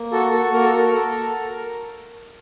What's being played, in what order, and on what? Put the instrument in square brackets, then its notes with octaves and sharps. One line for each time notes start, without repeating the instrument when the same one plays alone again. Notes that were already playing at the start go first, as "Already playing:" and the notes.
Already playing: [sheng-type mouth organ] A#3
F#4 A4
F#4 A4
A#3 A#4
A4
F#4 A#4
A4